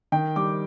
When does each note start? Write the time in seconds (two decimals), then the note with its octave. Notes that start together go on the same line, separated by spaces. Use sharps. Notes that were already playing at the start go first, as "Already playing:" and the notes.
0.12 D#3 G5
0.36 G3 D6